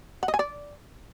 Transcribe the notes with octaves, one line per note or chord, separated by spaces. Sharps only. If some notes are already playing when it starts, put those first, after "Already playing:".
F#5
D#5
G#5
D5